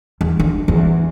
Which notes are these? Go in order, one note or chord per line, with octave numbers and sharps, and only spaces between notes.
E2
D3
E2